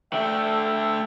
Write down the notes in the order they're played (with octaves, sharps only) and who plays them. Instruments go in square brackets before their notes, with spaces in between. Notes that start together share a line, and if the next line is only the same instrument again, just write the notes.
[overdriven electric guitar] D3 A3 [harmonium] E5 G5